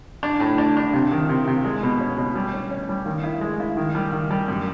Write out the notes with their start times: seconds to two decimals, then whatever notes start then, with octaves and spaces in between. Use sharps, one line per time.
0.23 D4
0.40 A2
0.58 D4
0.77 D4
0.93 C3
1.12 D#3
1.29 C3
1.48 C3
1.65 G#3
1.83 B2
2.00 C#4
2.17 B2
2.35 G3
2.54 C#4
2.71 C#4
2.89 G3
3.06 D#3
3.23 E4
3.41 G#3
3.60 E4
3.77 D#3
3.95 G3
4.12 D#3
4.31 G3
4.48 F#2